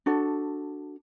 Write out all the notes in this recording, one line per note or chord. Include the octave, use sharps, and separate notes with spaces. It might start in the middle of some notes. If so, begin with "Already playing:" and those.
D4 F#4 A4